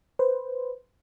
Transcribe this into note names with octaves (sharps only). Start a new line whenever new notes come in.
B4 C5